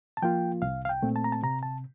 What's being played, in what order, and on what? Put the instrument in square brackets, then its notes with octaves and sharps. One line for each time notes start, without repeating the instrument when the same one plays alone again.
[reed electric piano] A5
F3 A#3 F4 G5
C2 F5
F5
G5
A#2 A3 C4
A5
A#5
A5
C3 A#5
A5